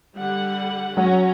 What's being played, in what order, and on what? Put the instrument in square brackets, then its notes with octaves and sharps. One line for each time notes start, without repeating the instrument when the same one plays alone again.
[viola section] D3 G3 F#5
[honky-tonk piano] F#3 F#5 [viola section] C#4 A#5